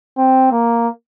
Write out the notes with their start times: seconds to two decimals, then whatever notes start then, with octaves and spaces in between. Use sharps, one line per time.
0.18 C4
0.51 A#3